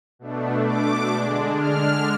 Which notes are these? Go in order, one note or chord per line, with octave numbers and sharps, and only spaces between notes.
B2 A3 D4
D6
D3 G#3 D4
F6